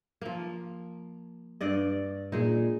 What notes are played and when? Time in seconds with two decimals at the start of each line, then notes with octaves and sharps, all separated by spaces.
0.21 F3 A#3
1.61 G2 D5 D#5
2.32 A#2 G#3 D#4